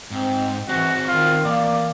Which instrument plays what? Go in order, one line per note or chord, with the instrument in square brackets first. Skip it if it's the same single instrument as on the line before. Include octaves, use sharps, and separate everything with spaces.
[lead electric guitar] G#2 [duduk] C4
[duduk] E3 [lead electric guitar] C4 G#4 [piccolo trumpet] F#4
[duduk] D#3 [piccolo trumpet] F4
[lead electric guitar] E3 A#5 [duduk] A#3 [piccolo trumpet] D5